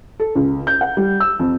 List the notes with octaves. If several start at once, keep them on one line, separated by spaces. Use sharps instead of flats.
A4
C#2
G6
F#5
G3
E6
F2